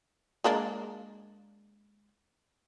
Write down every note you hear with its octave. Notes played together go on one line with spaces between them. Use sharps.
G#3 A#3 D4